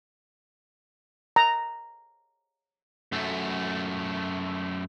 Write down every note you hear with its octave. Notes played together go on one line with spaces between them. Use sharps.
A#5
F#2 A3